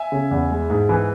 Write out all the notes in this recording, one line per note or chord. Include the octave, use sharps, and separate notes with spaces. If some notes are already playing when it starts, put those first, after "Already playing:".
Already playing: E5 G#5
C#3
E2
G#3
G#2
E3